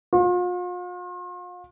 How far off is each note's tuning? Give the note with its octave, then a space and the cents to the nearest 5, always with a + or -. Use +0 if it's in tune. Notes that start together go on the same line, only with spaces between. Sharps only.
F4 +40